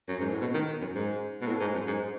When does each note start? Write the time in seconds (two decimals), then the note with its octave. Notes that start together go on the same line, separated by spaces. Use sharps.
0.08 F#2
0.19 G#2
0.29 A2
0.41 B2
0.54 D#3
0.81 F#2
0.95 G#2
1.41 B2
1.47 A2
1.61 G#2
1.74 F#2
1.87 G#2